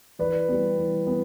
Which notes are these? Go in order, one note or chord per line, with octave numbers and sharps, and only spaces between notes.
E3 B4 D5
G3 B3
E3
B3